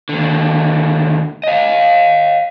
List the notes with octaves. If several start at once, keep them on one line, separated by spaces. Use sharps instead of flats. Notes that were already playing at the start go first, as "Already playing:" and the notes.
D#2 D3
D#5 F5